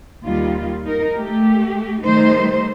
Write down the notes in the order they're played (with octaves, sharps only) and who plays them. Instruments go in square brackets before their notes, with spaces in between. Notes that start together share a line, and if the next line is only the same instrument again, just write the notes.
[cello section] D#2 D#3 G3 F4
D#4 A#4
A3 G4
D#3 G3 A3 D#4 C5